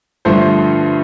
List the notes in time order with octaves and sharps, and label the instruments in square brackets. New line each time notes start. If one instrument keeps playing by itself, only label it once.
[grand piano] G2 D3 F3 A3 C5